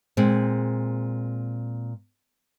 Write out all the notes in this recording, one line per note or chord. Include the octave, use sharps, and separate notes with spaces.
A#2 G#3 C4